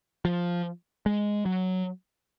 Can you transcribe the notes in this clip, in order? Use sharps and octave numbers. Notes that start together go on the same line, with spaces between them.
F3
G#3
F#3